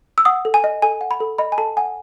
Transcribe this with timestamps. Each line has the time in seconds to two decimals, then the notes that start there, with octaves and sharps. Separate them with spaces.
0.18 E6
0.25 F#5 D#6
0.45 A4
0.54 G#5
0.64 D#5
0.82 A4 G#5
1.01 F#5
1.11 B5
1.20 A4
1.38 D#5 B5
1.52 G#5
1.58 A4 A5
1.77 F#5 G#5